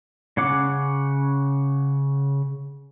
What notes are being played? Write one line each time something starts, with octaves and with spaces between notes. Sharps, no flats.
C#3 C#4 F#5 D6